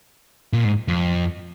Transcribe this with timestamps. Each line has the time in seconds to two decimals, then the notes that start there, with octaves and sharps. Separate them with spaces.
0.53 A#2
0.65 G#2
0.88 F2